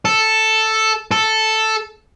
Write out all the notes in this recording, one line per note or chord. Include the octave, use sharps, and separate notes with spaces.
A4
A4